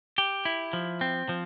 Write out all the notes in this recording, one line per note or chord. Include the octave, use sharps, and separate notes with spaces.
G4
E4
F3
C4
F3